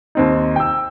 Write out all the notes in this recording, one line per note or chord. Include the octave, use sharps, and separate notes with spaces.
D#2 C4 D#4
G5 E6